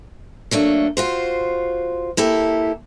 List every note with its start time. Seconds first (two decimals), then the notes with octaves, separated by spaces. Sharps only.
0.51 F#3 A3 A#3 D4
0.97 F4 F#4 C5
2.17 A#3 E4 G4 A4